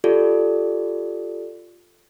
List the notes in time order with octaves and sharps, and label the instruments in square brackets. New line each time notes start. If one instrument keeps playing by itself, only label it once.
[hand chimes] F4 G4 A4 D5